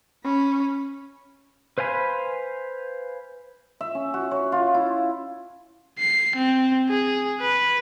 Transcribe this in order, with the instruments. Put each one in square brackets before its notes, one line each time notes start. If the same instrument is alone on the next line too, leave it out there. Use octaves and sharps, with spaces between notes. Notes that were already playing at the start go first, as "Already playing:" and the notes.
[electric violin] C#4 B5
[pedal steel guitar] B4 C5 F5 G#5 B5
[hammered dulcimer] E5
C#4
F#4
C#5
F4
E4
[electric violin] C7
C4
G#4
B4